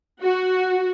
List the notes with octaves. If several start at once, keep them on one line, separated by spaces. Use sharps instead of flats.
F#4